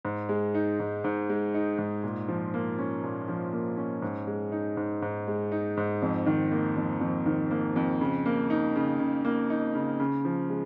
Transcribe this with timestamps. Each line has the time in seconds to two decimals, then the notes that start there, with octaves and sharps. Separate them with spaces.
0.05 G#2
0.29 G#3
0.54 D#4
0.80 G#2
1.04 G#2
1.30 G#3
1.54 D#4
1.78 G#2
2.04 A#2
2.28 F3
2.54 A#3
2.79 C#4
3.04 A#2
3.28 F3
3.53 A#3
3.77 C#4
4.02 G#2
4.27 G#3
4.52 D#4
4.77 G#2
5.02 G#2
5.28 G#3
5.52 D#4
5.77 G#2
6.02 F2
6.26 D#3
6.52 A#3
6.77 F2
7.01 F2
7.26 D#3
7.51 A#3
7.76 F2
8.01 C#3
8.26 A#3
8.50 D#4
8.76 C#3
9.00 C#3
9.25 A#3
9.50 D#4
9.75 C#3
10.00 C#3
10.25 F3
10.49 G#3